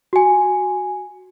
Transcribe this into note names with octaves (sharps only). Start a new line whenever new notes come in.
F#4 G#5